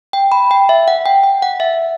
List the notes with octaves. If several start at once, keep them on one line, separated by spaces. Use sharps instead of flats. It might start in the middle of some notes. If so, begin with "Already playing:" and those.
G5
B5
G5
E5
F#5
G5
G5
F#5
E5